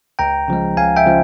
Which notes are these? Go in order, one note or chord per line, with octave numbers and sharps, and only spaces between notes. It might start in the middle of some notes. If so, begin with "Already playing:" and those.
C#2 G5 A#5
C#3 F3 G#3
C#2 F5 G#5
E5 G5
C#3 F3 G#3